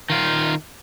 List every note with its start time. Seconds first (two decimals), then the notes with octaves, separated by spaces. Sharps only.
0.10 D#3 F4